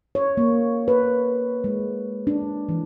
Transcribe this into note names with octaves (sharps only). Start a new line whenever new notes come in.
C#5
A#3
B4
G#3
D4
E3